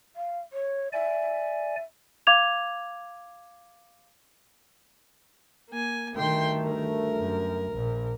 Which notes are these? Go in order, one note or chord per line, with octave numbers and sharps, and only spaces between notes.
F5
C#5
D5 E5 G#5
F5 D6 G#6 F7
A#3 G#5
D2 G2 D#3 A3 G5 C6
A#4
F#2
A#1 A#2